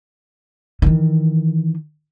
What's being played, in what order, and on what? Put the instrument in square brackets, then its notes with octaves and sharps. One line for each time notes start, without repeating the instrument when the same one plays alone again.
[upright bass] D#3 E3